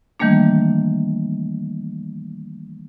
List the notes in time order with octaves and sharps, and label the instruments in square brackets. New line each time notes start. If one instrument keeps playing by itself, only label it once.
[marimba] D#3 E3 G3 A3 A#3 D4